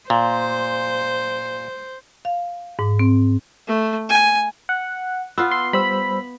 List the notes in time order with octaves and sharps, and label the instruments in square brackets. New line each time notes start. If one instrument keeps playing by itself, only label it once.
[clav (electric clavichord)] A#2 [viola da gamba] C5
[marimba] F5
G#2
C4
[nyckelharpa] A3
G#5
[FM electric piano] F#5
[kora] B3 F4 [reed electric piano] E6
[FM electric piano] C6
[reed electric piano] G3 C5 E6 [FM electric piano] B5